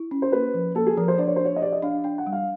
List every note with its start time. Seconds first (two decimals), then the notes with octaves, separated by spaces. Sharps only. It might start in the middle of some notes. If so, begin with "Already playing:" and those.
Already playing: E4
0.11 C#4
0.22 C5
0.32 A#3 B4
0.54 F3
0.75 A#3 A4
0.87 G#4
0.97 F3 A#4
1.08 C5
1.18 D4 D5
1.27 C#5
1.36 D4 C5
1.45 C#5
1.56 D#5
1.62 G4 D5
1.72 D#5
1.82 D4 F5
2.04 D4 G5
2.18 F#5
2.27 G3
2.33 F5